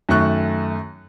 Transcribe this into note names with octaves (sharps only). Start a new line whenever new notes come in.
F#2 D#3 A3 C#6 F#6